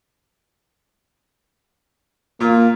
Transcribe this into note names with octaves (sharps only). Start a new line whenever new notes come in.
A#2 A#3 F4